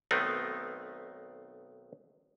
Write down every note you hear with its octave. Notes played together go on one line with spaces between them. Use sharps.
B1 D#3 A3 B3 C4 D#4